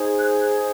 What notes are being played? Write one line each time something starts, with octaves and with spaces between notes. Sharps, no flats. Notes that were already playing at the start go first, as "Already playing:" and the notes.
Already playing: D#4 G#4 C5
F#6
F#6